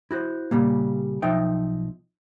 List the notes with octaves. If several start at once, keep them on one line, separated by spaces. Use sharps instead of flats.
E4 F#4 C5
A#2 C#3 G3 A#3
B1 F3 D#4 E5 G5